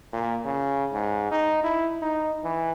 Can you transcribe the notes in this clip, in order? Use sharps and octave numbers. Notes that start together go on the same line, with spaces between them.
A#2
C#3
G#2
D#4
E4
D#4
E3